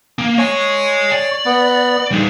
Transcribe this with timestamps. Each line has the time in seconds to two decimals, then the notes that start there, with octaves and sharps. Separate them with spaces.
0.19 A#3
0.38 C#5 D#5 G#5
1.12 D5
1.45 B3
2.11 G3 D#4